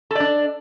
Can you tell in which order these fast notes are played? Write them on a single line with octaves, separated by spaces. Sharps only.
A4 D5 D4